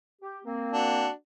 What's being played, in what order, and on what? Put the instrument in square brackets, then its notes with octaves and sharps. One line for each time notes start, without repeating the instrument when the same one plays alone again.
[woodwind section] G4
A#3 C4
[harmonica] D4 F#4